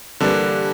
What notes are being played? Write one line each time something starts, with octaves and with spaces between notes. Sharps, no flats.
G2 D3 E3 G3 A#3 D4